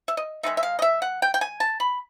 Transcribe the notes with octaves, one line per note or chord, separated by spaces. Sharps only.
E5
D#5
D#3 G#3 C4 D#4 E5
E5
F5
D#5
E5
F#5
G5
G5
G#5
A5
B5